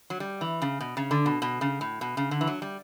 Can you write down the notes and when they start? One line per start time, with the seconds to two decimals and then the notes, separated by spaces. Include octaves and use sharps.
0.10 F#3
0.20 G3
0.41 E3
0.62 C#3
0.81 B2
0.97 C#3
1.11 D3
1.26 B2
1.42 B2
1.61 C#3
1.81 A2
2.01 B2
2.17 C#3
2.31 D3
2.41 E3
2.47 F#3
2.62 G3